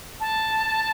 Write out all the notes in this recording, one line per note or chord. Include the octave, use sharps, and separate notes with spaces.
A5